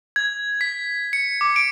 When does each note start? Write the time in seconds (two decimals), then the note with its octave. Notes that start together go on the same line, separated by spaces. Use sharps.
0.16 G#6
0.61 B6
1.13 C#7
1.41 D6
1.56 D7